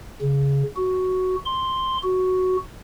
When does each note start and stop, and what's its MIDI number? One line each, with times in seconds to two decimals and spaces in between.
0.22 0.63 49
0.76 1.35 66
1.46 1.98 84
2.03 2.56 66